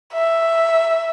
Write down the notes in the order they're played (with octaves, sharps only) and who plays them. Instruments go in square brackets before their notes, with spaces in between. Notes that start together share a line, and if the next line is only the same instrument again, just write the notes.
[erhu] E5